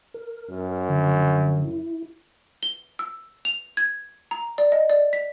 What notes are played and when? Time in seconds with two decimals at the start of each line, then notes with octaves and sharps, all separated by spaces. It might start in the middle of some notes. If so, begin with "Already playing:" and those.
0.14 A#4
0.49 F#2
0.89 D3 F3
1.65 E4
2.63 G7
2.99 E6
3.45 F7
3.77 G#6
4.31 A#5
4.58 D5
4.72 D#5
4.90 D5
5.13 B6